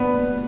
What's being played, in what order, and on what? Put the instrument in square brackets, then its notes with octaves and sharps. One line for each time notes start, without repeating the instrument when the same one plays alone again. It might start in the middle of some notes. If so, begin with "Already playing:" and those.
Already playing: [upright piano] B3 [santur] D4 B4